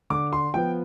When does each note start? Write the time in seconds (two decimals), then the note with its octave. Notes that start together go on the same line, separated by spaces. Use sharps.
0.10 D3 D6
0.33 C6
0.54 F3 B3 G5